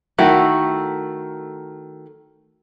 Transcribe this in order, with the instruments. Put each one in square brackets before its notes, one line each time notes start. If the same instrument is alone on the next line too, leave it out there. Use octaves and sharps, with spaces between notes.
[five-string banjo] D#3 A3 E4 F#4